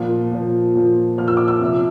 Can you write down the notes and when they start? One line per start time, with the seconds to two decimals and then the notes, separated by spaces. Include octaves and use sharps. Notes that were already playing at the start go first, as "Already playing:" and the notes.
Already playing: A#2 F3 F5
0.31 A#2 F3
0.75 A#2 F3
1.18 A#2 F3 F6
1.28 E6
1.37 D6
1.48 E6
1.60 C3 F3